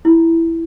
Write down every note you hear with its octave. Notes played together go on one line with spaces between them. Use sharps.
E4